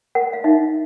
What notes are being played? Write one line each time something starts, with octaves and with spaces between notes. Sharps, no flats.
A#4 F#5
F5
D#4 E5